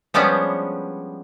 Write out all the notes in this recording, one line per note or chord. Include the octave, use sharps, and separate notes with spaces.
F3 G3 G#3 B3 C#4 D4